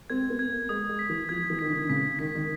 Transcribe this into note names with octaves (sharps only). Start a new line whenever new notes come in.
C4 G#6
B3
G#6
A#3
G#3 D#6
G#3
B6
E3
F3 G#6
E3
D#3 B6
D3
C#3 B6
D#3 B6
D#3